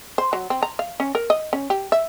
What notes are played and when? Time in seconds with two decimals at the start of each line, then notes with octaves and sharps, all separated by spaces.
0.18 C5
0.33 F#3
0.50 C4
0.63 A#5
0.79 F5
1.00 C#4
1.15 A#4
1.30 D#5
1.53 C#4
1.70 G4
1.92 E5